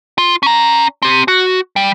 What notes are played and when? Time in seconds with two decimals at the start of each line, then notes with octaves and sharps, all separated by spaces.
0.18 F4
0.43 C#4 A#5
1.02 C4 G4
1.28 F#4
1.76 G3